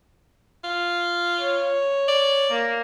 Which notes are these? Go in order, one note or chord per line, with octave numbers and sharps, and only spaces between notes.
F4
C#5
D5
A#3